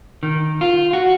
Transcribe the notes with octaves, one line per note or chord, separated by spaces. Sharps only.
D#3
F4
F#4